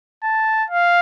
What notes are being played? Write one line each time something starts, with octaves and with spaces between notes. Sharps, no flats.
A5
F5